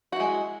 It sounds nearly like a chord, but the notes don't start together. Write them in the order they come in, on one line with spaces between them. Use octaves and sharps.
F#4 E4 G#3